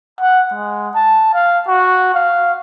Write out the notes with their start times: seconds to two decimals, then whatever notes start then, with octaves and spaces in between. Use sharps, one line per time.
0.20 F#5
0.54 G#3
0.95 A5
1.34 F5
1.68 F#4
2.15 F5